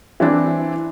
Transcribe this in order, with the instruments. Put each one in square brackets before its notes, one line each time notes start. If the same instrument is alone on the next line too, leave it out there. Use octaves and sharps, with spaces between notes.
[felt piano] E3 C4 D4 E4